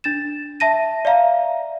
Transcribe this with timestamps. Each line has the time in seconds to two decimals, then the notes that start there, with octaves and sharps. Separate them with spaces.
0.04 D4 A6 E7
0.60 E5 A5 A#6 D#7
1.05 D5 E5 F5 A#5